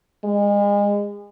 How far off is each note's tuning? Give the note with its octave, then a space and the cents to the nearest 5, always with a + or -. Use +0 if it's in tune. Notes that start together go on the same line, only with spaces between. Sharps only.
G#3 -30